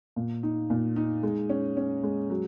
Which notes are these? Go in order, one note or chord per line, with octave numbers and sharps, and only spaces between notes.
A#2
D#4
A#2
D#4
G#3
C#4
C#4
G#3
F#3